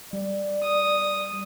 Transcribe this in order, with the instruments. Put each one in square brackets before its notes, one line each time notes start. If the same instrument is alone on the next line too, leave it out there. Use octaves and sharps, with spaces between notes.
[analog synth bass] G3 [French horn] D5
[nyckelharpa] D#6